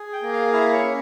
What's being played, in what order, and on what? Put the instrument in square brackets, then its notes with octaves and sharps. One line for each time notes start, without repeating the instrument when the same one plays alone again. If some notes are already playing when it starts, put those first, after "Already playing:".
Already playing: [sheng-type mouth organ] G#4
G5
A#3
F5
E4 F5
C#5
C#4